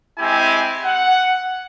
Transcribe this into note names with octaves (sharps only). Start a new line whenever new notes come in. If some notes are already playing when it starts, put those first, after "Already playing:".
G#3 C4 E4 G4 G#5
F#5